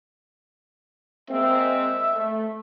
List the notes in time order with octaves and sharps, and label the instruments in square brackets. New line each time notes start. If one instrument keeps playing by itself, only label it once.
[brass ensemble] G#3 A#3 C4 [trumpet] E5
[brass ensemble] A3